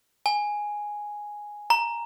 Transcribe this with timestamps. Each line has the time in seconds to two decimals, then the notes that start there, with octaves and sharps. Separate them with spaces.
0.26 G#5
1.70 A#5